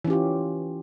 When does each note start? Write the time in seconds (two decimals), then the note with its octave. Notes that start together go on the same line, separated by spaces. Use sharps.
0.04 E3
0.07 C#4
0.10 G4
0.13 F4